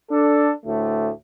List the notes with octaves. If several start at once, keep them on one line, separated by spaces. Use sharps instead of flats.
D4 A4
D2 A2 A3